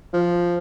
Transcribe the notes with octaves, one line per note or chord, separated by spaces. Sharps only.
F3